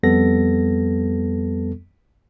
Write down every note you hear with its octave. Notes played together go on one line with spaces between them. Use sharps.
F2 G3 B3 A4 A#6